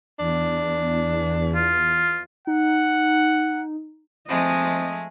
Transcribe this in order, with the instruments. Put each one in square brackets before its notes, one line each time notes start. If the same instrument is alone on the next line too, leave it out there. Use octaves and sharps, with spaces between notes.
[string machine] E2 [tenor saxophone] D4
[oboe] F4
[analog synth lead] D#4 [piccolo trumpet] F#5
[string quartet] F3 G#3 A3 [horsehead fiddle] C4 D#5